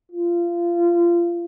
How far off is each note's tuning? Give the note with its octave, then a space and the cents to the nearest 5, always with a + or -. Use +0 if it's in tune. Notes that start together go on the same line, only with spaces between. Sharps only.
F4 -25